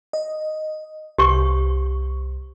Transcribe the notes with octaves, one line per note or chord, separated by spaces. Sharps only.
D#5
C2 G4 C#6